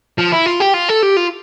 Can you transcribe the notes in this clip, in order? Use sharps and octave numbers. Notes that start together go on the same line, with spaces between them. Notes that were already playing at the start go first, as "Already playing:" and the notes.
F3
E4
F4
G4
F4
A4
G4
F4